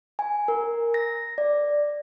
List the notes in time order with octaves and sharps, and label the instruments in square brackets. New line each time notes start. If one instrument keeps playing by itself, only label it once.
[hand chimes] G#5
A#4
A#6
D5